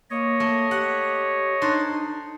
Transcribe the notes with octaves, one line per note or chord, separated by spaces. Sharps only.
A#3 C#5 D#5
A3
G4 F#5
D4 D#4 C5